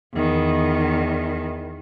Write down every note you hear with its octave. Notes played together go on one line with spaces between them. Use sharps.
E2 D#3